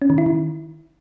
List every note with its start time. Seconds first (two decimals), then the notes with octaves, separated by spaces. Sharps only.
0.02 C#4
0.10 D#3
0.18 E4
0.26 D#3